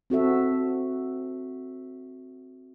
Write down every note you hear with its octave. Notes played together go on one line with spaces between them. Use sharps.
C4 F#4 A4 E5